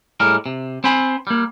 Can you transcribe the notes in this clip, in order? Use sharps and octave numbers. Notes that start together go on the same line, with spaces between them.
A2 G3 G#3 A#4
C3
C4 C5 G#5 B5
G3 A#3